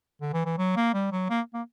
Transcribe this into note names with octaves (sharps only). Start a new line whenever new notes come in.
D3
E3
E3
F#3
A#3
G3
F#3
A#3
A#3